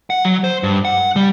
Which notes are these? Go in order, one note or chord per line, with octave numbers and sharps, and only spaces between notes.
F#5
F#3
C5
G2
F#5
G3